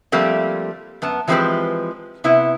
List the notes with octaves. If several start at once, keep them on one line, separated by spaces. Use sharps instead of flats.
F3 G3 A3 A#3 C4
F#2 B3 A5
E3 F3 G#3 C4 G4 B4
C3 B3 E4